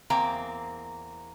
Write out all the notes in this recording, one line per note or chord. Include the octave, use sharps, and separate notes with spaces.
E2 A#3 C4 A#5